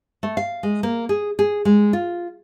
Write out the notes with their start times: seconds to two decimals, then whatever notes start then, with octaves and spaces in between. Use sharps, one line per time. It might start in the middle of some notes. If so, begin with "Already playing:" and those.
0.23 A3
0.37 F5
0.63 G#3
0.83 A#3
1.09 G#4
1.39 G#4
1.65 G#3
1.93 F4